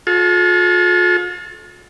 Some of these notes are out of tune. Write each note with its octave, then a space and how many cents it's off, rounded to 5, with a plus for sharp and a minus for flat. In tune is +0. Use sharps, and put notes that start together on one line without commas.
F4 +40 A4 -35